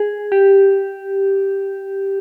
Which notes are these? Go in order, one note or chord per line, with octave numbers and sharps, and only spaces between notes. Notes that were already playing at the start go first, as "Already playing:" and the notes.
Already playing: G#4
G4